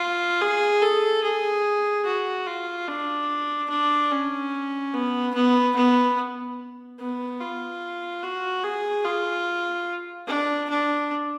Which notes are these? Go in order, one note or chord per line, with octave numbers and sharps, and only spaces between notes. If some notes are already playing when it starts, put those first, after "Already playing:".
Already playing: F4
G#4
A4
G#4
F#4
F4
D4
D4
C#4
B3
B3
B3
B3
F4
F#4
G#4
F4
D4
D4